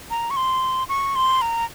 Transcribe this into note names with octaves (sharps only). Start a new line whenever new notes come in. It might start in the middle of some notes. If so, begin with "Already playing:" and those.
A#5
C#6
C6
C#6
C6
A#5